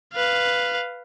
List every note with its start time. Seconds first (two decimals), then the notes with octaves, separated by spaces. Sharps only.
0.14 B4 F5